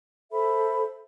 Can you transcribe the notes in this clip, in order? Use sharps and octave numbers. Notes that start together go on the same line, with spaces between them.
A4 C5 E5 B5